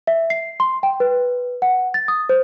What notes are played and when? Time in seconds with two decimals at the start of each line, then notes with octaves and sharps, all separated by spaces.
0.07 E5
0.30 C7
0.60 C6
0.83 G5
1.00 B4
1.62 F#5
1.94 A6
2.08 D#6
2.29 C5